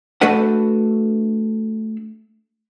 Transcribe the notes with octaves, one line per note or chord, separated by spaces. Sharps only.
A3 D4 F#4 A4 B4 F#5